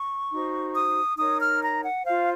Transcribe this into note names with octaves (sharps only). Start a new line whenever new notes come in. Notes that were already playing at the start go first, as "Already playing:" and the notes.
Already playing: C#6
D#4 F#4 C5
D#6
D#4 A#4 C#5 D#6
F6
A#5
F#5
F4 C5 F5